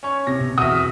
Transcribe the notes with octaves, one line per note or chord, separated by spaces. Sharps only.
C#4 C#5
C3 A#6
B2
E2 B2 F#4 E5 D#6 F6